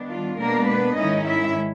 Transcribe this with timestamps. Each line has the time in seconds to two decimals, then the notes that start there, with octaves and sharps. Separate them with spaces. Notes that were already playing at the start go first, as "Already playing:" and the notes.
Already playing: D#3 G3 B3 D4
0.10 F4
0.40 B2 G#3 A#3 B3 D4 A#4
0.68 B3 B4
0.97 G#2 D#3 G#3 C#4 D#4 E4 D#5
1.27 E4 E5